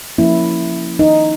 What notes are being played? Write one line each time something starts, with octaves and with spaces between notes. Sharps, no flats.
F3 A#3 C#4 E4
D#4